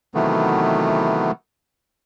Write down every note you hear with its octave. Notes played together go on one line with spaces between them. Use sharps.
C3 D#3 E3 F#3 A3 B3